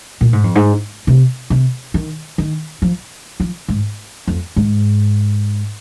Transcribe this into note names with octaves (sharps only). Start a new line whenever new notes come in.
A#2
G#2
F2
G#2
C3
C3
D#3
D#3
F3
F3
G#2
F2
G#2